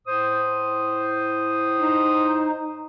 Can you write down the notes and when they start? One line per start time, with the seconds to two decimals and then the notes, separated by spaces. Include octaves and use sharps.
0.07 A2 C5 D#6
1.78 D#4